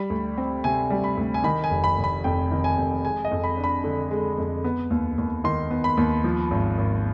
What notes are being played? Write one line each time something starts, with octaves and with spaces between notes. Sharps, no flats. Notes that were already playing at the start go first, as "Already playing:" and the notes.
Already playing: G3 B5
D2
C4
C3 G#5
G3
B5
D2
G#5
D#3 B5
G#5
F1
B5
F1
B5
F2 G5
D#3
G#5
F1
G#3 G#5
D#5
F2
B5
D4
B5
D3
G#3
F2
B3
D#2
D#2
D#3 C6
B3
B5
D#2
F3
G#1
G#1